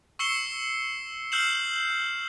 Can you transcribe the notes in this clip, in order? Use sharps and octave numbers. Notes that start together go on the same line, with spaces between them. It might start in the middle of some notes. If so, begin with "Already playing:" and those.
C#6 E6 C7 C#7 E7 G7
E6 F6 G6 C7 E7 F#7